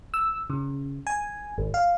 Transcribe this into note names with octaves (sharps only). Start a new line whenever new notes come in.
E6
C#3
G#5
G#1
F5